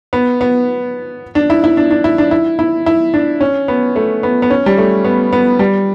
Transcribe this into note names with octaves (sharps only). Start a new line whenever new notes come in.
B3
B3
D4
E4
E4
D4
D4
E4
D4
E4
E4
E4
D4
C#4
B3
A3
B3
B3
C#4
G3
A3
B3
B3
G3